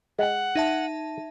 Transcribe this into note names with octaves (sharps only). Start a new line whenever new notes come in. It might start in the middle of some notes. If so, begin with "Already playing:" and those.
G#3 F#5 G5
D#4 E5 A5